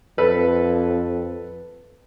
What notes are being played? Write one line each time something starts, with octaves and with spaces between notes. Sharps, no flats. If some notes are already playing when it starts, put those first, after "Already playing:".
F2 A4 B4